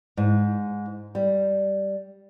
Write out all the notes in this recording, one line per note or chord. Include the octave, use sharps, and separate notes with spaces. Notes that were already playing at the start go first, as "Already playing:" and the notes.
G#2
G3